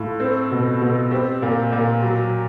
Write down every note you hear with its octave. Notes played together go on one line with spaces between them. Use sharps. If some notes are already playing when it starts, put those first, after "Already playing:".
Already playing: A2 F4
C4
B2
B2
C4 G4
A#2
A#2
F#3